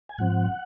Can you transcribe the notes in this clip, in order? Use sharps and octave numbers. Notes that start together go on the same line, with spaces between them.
G#5
G#2 F3 C4 F#5